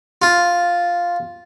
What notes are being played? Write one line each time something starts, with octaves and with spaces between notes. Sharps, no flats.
F4